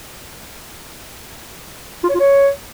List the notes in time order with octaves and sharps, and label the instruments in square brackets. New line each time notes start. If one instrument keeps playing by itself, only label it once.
[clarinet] F4
C#5
F4
C#5